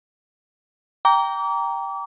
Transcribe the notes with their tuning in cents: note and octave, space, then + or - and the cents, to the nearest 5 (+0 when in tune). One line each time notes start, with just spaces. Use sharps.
G5 +0 A#5 +0 D6 -35